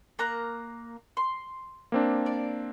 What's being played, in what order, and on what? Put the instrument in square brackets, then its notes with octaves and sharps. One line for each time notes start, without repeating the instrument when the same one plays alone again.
[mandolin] A#3 A#5 F#6
C6
[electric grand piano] A#3 C4 D4
[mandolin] D5